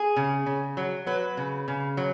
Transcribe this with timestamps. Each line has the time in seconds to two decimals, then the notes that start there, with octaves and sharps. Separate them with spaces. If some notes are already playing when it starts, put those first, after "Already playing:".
Already playing: G#4
0.16 C#3
0.46 C#3
0.77 F#3
1.07 F#3 B4
1.37 C#3
1.68 C#3
1.97 F#3